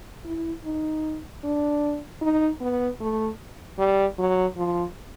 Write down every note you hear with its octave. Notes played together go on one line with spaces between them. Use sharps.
E4
D#4
D4
D#4
B3
A3
G3
F#3
F3